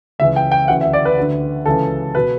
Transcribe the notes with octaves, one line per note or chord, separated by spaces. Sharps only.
C#2 C#3 E3 E5
G5
G5
D2 C#3 E3 F#5
E5
D5
B4
D2 D3
C#2 C#3 E3 A4
B2 B4